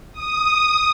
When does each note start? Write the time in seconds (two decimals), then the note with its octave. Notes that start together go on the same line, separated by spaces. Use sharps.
0.13 D#6